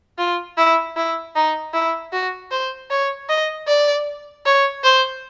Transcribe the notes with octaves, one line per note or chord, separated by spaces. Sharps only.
F4
E4
E4
D#4
E4
F#4
C5
C#5
D#5
D5
C#5
C5